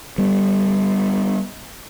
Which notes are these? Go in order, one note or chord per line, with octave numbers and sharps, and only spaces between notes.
G3 B3